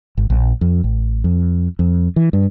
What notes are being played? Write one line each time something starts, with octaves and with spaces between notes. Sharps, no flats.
G#1
A#1
F2
A1
F2
F2
E3
G2